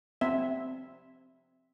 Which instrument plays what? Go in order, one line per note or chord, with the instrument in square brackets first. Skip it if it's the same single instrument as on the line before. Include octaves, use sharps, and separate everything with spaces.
[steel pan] C4 E5